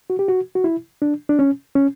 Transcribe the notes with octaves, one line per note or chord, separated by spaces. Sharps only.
F#4
G4
F#4
F#4
E4
D4
D4
C#4
C#4